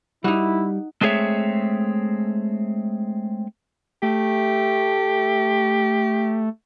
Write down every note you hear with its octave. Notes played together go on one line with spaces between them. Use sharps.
G3 D#4 E4 F#4
G#3 A3 C4 G#4 C#5 E5
A3 G4